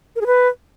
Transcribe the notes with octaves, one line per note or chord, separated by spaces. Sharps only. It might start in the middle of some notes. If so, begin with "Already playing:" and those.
A#4
G#4
B4